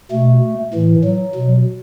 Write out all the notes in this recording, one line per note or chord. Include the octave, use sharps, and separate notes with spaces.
B2 A3
A2 E3
F#3
B2